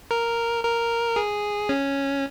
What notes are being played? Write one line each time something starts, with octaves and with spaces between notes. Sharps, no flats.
A#4
A#4
G#4
C#4